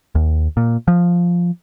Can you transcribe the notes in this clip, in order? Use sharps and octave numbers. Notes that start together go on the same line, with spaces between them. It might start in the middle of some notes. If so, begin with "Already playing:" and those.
D#2
A#2
F3